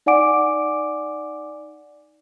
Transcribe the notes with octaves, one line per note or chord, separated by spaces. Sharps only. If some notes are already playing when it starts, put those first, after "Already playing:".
D#4 D5 F#5 G#5 D6 D7